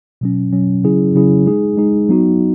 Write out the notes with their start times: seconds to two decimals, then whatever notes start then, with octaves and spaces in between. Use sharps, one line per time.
0.21 B2 F#3 C#4
0.52 B2 F#3 C#4
0.84 C#3 F#3 C#4 E4 G#4
1.15 C#3 F#3 C#4 E4 G#4
1.46 G#3 D#4 G#4
1.77 G#3 D#4 G#4
2.09 F#3 B3 D#4 F#4